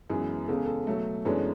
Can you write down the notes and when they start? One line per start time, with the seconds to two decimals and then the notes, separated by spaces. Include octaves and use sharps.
0.10 F#2 E3 G#3 B3 G#4
0.48 E2 C#3 G#3 A4
0.56 G#4
0.65 A4
0.87 B2 F#3 A3
1.25 F#2 E3 G#3 B3 D4 A4 C#5